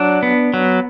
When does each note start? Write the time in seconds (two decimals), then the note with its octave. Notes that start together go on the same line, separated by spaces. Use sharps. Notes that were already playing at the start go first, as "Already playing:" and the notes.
Already playing: F#3 D4 F#5
0.23 B3
0.54 F#3